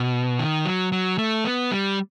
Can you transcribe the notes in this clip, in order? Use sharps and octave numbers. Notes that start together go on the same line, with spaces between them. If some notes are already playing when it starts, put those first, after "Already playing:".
Already playing: B2
D#3
F#3
F#3
A3
B3
G3